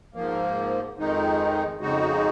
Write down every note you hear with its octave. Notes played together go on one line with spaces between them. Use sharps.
G#2 F3 A#3
F2 D#3 G#3 D#4
F2 C#3 G#3 D#4 F#4